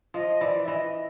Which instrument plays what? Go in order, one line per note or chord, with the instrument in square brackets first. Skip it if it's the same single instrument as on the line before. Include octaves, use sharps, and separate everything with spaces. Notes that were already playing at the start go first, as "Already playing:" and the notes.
[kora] F3 [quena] D#5
[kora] E3 [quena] D5
[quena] E5
[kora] E3 [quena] D#5